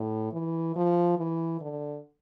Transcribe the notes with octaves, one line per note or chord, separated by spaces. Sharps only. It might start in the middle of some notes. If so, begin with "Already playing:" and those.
Already playing: A2
E3
F3
E3
D3